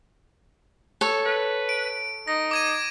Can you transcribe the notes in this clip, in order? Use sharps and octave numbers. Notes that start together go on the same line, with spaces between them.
A4 C#5
B4
D7
D#4 A#6
D6 G#6 D#7